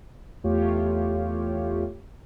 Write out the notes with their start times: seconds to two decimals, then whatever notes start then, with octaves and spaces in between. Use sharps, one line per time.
0.44 E2 A3 F4 G4 C#5